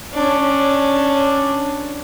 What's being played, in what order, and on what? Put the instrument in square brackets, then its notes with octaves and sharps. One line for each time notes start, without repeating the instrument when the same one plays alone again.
[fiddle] C#4 D4